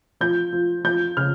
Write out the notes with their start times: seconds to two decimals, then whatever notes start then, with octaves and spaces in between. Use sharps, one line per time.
0.20 F3 G6
0.53 F3
0.84 F3 G6
1.17 C#3 F6